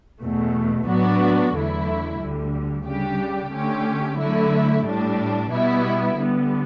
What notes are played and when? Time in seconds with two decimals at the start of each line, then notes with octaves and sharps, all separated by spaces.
0.21 E2 B2 A3
0.87 A2 F#3 B3 D4 F#4
1.54 E2 D3 F#3 A3 E4
2.19 D2 D3 G3
2.86 C#3 G3 D4 G4
3.52 D3 A3 C#4 G4
4.18 D3 F#3 A3 E4
4.85 A2 G3 D4
5.50 B2 G3 B3 E4
6.17 D3 G3 B3